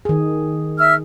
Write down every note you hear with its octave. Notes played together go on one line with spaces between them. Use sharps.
D#3 G#4
E5 E6 F6